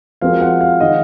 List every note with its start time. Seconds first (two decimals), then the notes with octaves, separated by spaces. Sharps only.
0.21 F3 G#3 C4 F#4 A#4 F5
0.41 F#5
0.61 F5
0.80 D#3 G#3 D#5